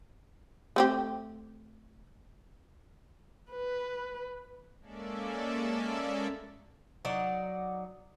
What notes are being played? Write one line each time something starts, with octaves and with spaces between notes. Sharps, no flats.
A3 C4 G4
B4
G#3 A#3 C#4 A4 D5 E5
F#3 D#4 D5 F#5